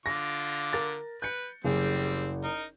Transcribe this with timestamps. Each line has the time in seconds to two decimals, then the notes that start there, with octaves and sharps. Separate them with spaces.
0.06 D3 F4 D6 A#6
0.73 A#4 A6
1.22 B4 G6 C#7
1.65 F#1 G3 C4 G#4
2.44 D#4 A#4